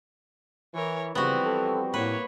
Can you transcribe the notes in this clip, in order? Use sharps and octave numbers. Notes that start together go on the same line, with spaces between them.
E3 A#4 C#5
C#3 E3 F3 G3 B3 C4 F#4
A4
A2 A#3 B4 C#5